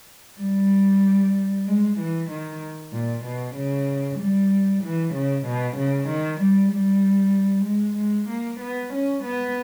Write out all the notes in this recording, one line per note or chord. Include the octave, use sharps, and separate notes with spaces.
G3
G#3
E3
D#3
A#2
B2
C#3
G3
E3
C#3
B2
C#3
D#3
G3
G3
G#3
G#3
A#3
B3
C#4
B3